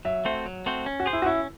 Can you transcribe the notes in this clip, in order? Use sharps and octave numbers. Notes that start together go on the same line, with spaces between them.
F#3 E5
A3 C4 F#4 C5
F#3
A3 C4 F#4 C5
C#4
F#4
G#4 C5
E4
F#4
C#4 E4